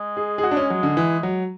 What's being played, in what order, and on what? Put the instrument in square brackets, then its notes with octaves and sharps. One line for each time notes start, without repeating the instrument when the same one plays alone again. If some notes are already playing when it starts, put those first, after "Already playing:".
Already playing: [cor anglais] G#3
[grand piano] G#4
G#4
F#4
D4
C#4
F#3
D3
E3
F#3